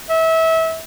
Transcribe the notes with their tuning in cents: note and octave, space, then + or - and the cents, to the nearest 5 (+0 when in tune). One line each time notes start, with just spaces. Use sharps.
E5 -25